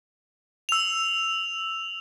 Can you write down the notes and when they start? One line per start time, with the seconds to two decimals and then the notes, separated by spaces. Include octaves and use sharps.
0.69 E6 F7